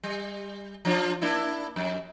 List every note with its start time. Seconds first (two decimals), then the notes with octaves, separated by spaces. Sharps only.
0.03 G3
0.85 F3 D4 F4
1.22 A#3 D4 E4
1.76 F2